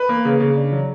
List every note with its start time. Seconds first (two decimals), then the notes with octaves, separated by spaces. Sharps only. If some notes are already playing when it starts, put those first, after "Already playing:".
Already playing: B4
0.09 A#3
0.25 C#3
0.40 C#3
0.56 D4
0.72 F#3